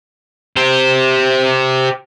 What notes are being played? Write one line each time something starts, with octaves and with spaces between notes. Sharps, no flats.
G4 C5